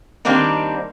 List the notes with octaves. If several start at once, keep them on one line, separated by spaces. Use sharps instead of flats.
D#3 G3 A#3 C4 D4 D#4